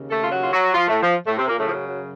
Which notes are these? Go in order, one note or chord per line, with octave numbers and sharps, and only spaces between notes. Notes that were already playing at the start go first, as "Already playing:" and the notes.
Already playing: D#2 C#3
A3 A4
F4
F#3 F#4
F4
F#3 F#4
F3 F4
A2 A3
F3
A2 A3
C3 C4
A#2 A#3
F#2 A2 C#3 A3
F3
F#3
F#3